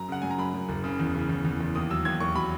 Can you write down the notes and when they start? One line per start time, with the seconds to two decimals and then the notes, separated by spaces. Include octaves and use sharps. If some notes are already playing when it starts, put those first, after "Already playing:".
Already playing: F#2 A#5
0.09 C#3 F#5
0.22 F#2 G#5
0.31 A#5
0.38 F#2 B5
0.54 F#2
0.69 F#1
0.84 C#3
1.00 E2
1.15 C#3
1.29 E2
1.45 E2
1.61 E2
1.75 D#2 D#6
1.90 F#3 E6
2.05 D#2 G#6
2.20 D#2 C#6
2.35 F#3 B5